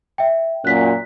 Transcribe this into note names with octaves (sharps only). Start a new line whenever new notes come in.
E5 G5
F#2 A#2 F#6 B6